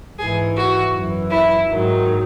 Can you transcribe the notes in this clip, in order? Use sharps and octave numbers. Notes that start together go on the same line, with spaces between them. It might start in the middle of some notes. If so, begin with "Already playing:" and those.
G#2 E3 G#4
F#4
F#2 E3
E4
G#2 D#3 F#3